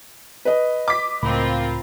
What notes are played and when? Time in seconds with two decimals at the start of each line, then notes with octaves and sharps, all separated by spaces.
0.45 B4 D#5
0.88 D6 B6
1.23 C#2 A2 C4 F4 A#4 B5